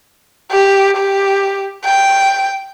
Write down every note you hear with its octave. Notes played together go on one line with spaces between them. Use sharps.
G4
G4
G5